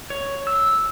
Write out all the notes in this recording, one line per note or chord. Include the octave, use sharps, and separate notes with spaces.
C#5
E6